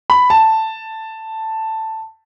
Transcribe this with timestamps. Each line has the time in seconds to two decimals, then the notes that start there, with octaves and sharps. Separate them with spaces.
0.10 B5
0.30 A5